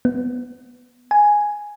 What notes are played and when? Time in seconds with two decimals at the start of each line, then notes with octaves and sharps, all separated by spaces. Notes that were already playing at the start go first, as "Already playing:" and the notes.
0.05 B3
1.11 G#5